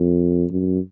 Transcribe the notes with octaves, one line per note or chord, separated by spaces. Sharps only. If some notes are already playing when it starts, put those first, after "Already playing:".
Already playing: F2
F#2